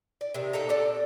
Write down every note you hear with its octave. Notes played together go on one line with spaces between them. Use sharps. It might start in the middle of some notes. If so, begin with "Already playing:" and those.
D5
C3 D#3
A#2 D#3 A4 A#5
C4 A4 D5